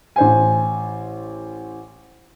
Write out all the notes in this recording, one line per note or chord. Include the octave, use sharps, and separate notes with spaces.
A1 C5 G#5